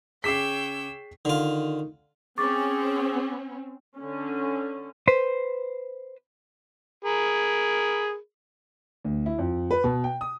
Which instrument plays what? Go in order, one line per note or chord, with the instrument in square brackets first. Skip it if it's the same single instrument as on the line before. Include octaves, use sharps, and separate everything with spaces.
[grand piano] C#3 D6 B6 [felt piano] G#4 C7 [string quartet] C#5 G5 E6
[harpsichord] D3 F4 [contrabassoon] D#3
[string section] C4 C#4 [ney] G#4 [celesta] C#6 D6 A6
[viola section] D3 C#4
[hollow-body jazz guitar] B4 C5
[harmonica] G#4 A#4 B5
[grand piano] D2
E4
F2
B4
B2
G5
D#6